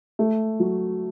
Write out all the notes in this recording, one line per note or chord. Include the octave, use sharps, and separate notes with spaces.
A3
F#3